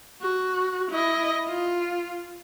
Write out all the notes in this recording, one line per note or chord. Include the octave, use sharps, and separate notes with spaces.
F#4
E4 D#5
F4